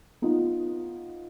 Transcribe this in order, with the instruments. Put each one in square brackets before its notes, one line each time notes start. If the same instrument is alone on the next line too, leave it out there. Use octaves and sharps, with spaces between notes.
[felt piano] B3 D#4 F4